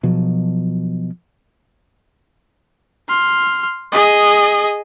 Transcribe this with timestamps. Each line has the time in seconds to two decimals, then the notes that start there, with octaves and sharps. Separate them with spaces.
0.03 B2 F3 F#3
3.09 C6 F6
3.92 G#4 D#5